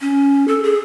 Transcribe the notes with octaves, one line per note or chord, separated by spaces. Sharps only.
C#4
A4
G#4